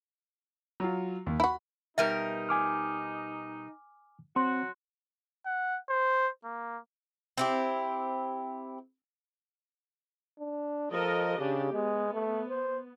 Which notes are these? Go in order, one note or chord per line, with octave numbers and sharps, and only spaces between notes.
F#3 F4
D#2
E4 F#4 B5
B2 G3 D#4 A#4 E5
G#5 D6 F6
F#3 C4 F#4 C6
F#5
C5
A#3
C4 E4 G4
D4
F3 A4 A#4 D#5
C#3 D4 G4
G#3 B3
A3
C5